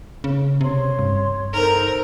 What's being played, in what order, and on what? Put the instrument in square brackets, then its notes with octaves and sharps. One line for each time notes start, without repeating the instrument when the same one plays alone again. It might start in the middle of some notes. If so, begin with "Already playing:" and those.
[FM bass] C#3
[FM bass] C3 [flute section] C#5 C6
[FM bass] G2
[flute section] D#4 A4 C5 [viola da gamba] A#4